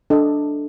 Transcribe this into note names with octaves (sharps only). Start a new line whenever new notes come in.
D4 A4 D#5